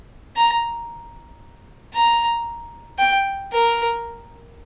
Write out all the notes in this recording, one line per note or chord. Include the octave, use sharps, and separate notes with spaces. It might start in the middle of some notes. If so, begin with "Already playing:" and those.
A#5
A#5
G5
A#4